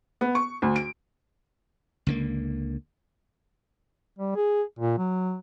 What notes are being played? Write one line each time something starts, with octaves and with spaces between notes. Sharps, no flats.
B3
C#6
D2
D7
C#2 D3 A#3
G3
G#4
A#2
F#3